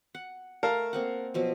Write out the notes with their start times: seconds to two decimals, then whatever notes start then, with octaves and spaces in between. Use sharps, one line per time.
0.15 F#5
0.63 A3 A#4 F5 A5
0.93 A#3 C4 F#5
1.34 B2 F3 F#3